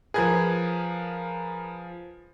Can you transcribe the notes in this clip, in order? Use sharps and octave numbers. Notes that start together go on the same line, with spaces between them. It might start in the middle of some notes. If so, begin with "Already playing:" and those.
F3 G#4 A#4 B4 G#6